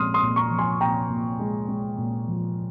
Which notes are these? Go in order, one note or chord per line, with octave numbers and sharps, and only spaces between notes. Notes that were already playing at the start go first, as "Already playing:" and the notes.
Already playing: A#2 F3 G#3 C6 D#6 F6
C6 D#6
A#2
A#5 C#6
F3
G#5 C6
A#2 G5 A#5
A#2
G#3
G#3
A#2
F3